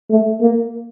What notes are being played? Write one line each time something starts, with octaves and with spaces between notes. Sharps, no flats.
A3
A#3